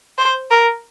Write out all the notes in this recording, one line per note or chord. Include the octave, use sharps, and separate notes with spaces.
C5
A#4